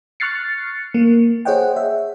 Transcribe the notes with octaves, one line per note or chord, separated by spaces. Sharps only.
C#6 F6 F#6 A6 C7 C#7
A#3
G#4 C5 C#5 D#5 F#5 G5
E5